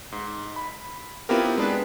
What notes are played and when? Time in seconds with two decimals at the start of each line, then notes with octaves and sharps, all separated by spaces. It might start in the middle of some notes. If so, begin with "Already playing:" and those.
0.12 G#2
0.56 B5
1.29 B3 C4 E4 F4 G4 A#4
1.57 G#3 D4 B4